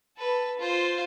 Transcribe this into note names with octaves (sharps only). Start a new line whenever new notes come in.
A4 B4
F4 C5